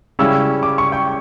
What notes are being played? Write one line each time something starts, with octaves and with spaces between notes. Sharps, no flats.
C#3 G3 C#4 E4 E6
D6
C#6
G5